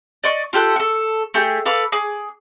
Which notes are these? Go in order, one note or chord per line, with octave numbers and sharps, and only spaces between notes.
D5 D#5 C#6
F4 G4 A4 F#5
A4 C#6
A3 G4 G#4 G6
A4 B4 F5 D6
G#4 D6